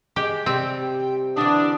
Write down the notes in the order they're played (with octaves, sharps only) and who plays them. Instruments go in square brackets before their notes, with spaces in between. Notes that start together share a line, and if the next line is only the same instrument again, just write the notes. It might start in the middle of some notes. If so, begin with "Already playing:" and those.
[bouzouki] G#3 [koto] G4
[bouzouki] C3 G3 [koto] C4 [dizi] G5
[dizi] G5
[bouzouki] D3 E3 [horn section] D4 [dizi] D#6